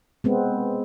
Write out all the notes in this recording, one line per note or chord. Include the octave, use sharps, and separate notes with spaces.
G#3 B3 C4